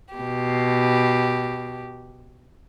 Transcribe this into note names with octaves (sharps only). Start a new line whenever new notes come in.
B2 G4